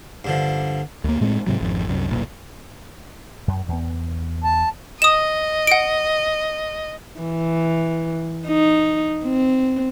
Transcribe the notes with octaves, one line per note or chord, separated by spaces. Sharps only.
G2 D3 F3
D2 A#3
A2 G#3 C4
G#2 C3 F#3
G#1 F2
C2 F#2
F#1 B1 A#2
F#2
E2 B3
A5
D#5 D#6 E7
F#5 D7
E3
D#4
C4